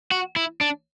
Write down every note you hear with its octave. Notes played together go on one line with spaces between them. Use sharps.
F#4
E4
D4